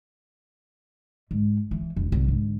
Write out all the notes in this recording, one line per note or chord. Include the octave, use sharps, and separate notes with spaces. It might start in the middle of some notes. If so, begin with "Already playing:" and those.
G#2
E3
E1
C2
G#2 D3